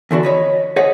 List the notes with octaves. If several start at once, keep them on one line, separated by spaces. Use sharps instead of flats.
E2 D3 F#4 D5
C#5 D#5 B5
G#4 C#5 D#5 F#5